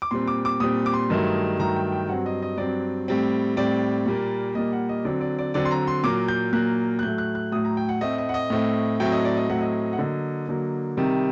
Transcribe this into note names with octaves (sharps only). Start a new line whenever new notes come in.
D6
A#2 G3 C4 C6
D6
D6
A#2 G3 C4 D#6
D6
C6
G2 D#3 F#3 A3
G2 D#3 F#3 A3 A#5
G5
G5
G2 F#3 C4 F#5
D#5
D#5
G2 F#3 C4 D5
A2 G3 C4
A2 G3 C4 D5
A#2 G3 A#3
A#2 G3 A#3 D#5
F#5
D#5
D3 F#3 C4 D5
D5
D5
D3 F#3 C4 D5
C6
A#5
C6
A#2 F#3 A#3 D6
G6
A#2 F#3 A#3 F#6
F#6
A2 F#3 A3 G6
F#6
F#6
A2 F#3 A3 D#6
A#5
G5
F#5
A2 A3 C4 D#5
D#5
F#5
D#5
A2 A3 C4
A2 F#3 A3 C4 G5
D#5
D5
D#5
A2 F#3 A3 C4 F#5
D#5
F#5
D3 F#3 A#3 D#5
D3 F#3 A#3
C3 D#3 G3